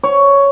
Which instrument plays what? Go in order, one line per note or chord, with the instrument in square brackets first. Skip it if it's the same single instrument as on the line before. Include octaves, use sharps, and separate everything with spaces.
[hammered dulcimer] C#5